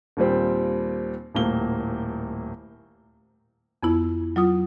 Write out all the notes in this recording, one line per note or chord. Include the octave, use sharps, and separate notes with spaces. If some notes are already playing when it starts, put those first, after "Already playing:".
D#2 A#2 G3 C4
D#1 A2 A#3 G7
F2 B3 E4
F#3 F4 D#6